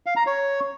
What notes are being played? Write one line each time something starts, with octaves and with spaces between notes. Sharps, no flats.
F5
A#5
C#5